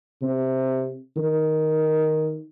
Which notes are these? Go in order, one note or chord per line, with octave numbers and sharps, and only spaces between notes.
C3
D#3